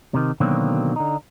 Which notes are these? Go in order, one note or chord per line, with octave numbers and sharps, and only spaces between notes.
C3 D#3
B2 D3 D#3 F#3 A#3 C4
D3 D#4